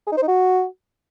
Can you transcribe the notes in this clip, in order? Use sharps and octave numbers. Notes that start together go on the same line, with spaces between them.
G#4
D#4
C5
D#4
F#4